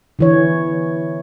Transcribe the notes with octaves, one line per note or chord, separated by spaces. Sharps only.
D3 E3 C#5